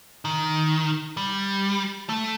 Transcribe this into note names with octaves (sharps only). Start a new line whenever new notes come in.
D#3
G3
A3